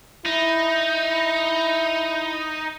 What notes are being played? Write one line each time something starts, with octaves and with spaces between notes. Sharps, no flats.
D#4 E4